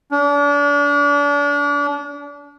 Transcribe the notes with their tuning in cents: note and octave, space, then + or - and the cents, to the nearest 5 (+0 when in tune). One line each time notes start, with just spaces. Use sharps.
D4 -35